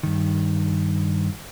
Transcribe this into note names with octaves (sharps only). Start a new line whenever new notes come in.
G2 D#3